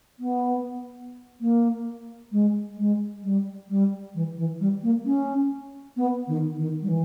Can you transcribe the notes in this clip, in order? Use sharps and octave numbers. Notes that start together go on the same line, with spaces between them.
B3
A#3
G#3
G#3
G3
G3
E3
E3
G3
A#3
C#4
B3
D#3
D#3
G3
E3